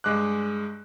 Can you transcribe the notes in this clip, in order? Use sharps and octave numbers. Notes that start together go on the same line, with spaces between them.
G2 G#3 D6 F#6